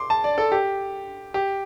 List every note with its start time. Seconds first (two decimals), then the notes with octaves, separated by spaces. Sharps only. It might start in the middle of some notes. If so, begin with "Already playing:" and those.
Already playing: C6 D6
0.10 A5
0.24 D5
0.38 A4
0.52 G4
1.34 G4